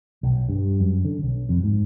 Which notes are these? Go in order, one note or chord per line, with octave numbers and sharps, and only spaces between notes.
B1
G2
F#2
D3
B1
F2
G#2